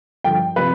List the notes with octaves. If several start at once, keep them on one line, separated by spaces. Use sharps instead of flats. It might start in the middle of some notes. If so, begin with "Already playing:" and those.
G2 D3 F3 G5
C3 F3 B4